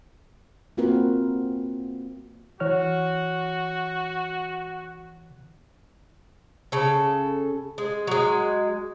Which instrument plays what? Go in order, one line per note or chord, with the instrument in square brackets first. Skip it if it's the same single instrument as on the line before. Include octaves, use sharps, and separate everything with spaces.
[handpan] A#3 C4 F4 F#4 A#4 B4
[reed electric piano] E3 C#5 F6 [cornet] F#4
[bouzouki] C#3 A4
G#3
F#3 G#3